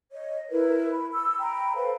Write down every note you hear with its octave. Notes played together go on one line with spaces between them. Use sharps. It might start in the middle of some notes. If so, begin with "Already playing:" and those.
C#5 D#5
E4 A#4 B4
B5
E6
G5 A#5 B5
A4 B4 C5 F5